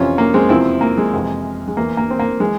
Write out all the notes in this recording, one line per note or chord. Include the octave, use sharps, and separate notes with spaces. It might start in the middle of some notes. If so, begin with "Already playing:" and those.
Already playing: F2 C3 E3 C#4 F4
A#3
G#3 C4
E2 C3 F3 C4 E4
A#3
G#3
F2 C3 E3
G#3
E2 E3 A#3
A#3
C4
A#3
E3 G#3